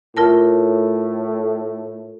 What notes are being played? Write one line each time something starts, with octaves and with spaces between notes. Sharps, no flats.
A2 F4 A#4 A5